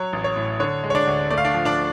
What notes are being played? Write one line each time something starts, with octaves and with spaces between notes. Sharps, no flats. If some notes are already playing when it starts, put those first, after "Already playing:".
Already playing: F#3 C#5
A1
C#5
A2
D3 C#5
G#3
C#5
D4 D5
D2
A3 D5
F5
D4 D5
F3
D4 D5